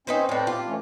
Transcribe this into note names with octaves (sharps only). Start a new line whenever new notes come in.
C4 C#4 D#4 B4 C5
A2 C4 B4 D5 G5
F4 G4
E3 A3 C#4